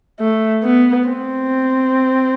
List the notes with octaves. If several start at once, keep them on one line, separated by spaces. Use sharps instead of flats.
A3
B3
C4